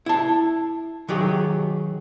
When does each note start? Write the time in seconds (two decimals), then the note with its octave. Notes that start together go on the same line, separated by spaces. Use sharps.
0.06 E4 A5
1.09 D#3 F#3 G4 G#4